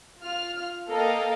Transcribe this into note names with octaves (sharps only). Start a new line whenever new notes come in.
F4 F6
A#3 A4 A#4 D#5 F5 G5